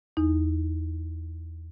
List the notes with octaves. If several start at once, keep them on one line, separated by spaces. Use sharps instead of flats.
E2 D#4